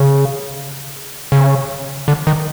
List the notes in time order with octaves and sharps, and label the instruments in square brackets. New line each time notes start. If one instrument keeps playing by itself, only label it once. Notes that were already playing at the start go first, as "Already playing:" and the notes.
Already playing: [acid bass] C#3
C#3
D3
D#3